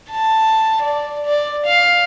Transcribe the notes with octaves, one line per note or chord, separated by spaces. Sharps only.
A5
D5
D5
F5